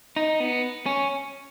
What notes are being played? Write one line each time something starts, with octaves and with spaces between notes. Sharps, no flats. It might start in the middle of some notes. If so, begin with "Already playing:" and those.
D#4
B3
C#4